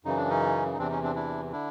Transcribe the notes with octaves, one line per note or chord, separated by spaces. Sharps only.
F#2 C#3 E3 D#4
D4
C#4 D#4
D#4
E2 C3 E3 C4 D4
C#4 D#4
C4 D4
D4 E4
D3 D4 E4